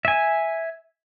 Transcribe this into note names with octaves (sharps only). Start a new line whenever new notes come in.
E5 G#5